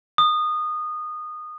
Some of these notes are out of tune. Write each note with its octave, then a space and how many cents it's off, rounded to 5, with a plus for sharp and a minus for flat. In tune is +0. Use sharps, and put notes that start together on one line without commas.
D#6 -20